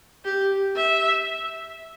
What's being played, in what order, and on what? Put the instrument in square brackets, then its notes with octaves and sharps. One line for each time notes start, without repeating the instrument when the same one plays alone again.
[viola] G4
E5